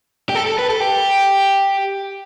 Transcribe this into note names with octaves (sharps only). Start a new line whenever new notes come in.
G4
A4
A4
B4
A4
G4